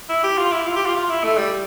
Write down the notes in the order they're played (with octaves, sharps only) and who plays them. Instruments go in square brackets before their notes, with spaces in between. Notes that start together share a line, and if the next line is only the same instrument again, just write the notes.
[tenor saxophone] E4
G4
F4
E4
F4
G4
F4
F4
E4
A3
G3